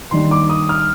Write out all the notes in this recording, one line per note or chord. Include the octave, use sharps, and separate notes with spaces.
D#2 D#3 G3 D4 C6
D6
D#6
F6